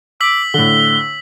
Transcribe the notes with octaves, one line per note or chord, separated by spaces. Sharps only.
D6 E6 B6 F#7
A2 D3 G7